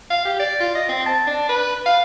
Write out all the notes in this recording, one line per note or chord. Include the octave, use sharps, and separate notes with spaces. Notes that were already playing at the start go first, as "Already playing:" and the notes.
F5
G4
D5
F4
D#5
C4
A5
D4
B4
F5